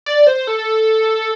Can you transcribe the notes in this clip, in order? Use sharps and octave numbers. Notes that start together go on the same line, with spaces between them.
D5
C5
A4